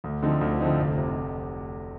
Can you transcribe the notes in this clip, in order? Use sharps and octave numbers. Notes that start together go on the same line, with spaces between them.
D2
D3 F3 C4 D#4
D2
D3 F3 C4 D#4
F1
C3